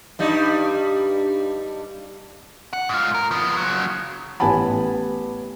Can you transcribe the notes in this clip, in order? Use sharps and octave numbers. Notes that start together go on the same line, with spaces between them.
G2 G3 D#4
F#5
G#2 F4
A#4
F3 B3
C#3 F#3
A1 B3 G4 G#5 A5 B5